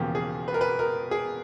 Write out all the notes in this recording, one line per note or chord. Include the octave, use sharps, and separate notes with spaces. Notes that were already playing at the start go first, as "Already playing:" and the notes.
Already playing: E1 E2 C#3 F3 A#3 G4
G#4
B4
A#4
B4
A#4
G#4